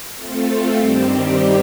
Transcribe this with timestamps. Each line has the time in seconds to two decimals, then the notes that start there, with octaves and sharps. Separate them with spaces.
0.15 A3 C4 F4 A4
0.78 G2 D#3 G3 C4 G4